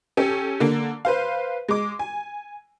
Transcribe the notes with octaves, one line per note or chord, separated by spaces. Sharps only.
C#4 G4 A4
D3 A#3
B4 C5 F5
G#3 D6
G#5